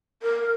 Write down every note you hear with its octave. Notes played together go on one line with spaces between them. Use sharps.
A#4